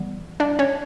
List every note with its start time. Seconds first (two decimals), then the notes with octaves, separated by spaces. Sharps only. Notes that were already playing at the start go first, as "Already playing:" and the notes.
Already playing: E3 G3 B3
0.40 D4 D5
0.59 C#4 C#5